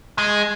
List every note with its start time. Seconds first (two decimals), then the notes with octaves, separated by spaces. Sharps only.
0.18 G#3